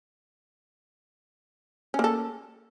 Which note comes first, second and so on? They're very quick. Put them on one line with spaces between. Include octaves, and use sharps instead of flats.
C#4 A#3 A4